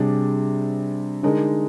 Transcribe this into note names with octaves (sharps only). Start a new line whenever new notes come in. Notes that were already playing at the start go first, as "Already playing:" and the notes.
Already playing: C3 G3 D4 G#4
D3 G#3 D#4 A#4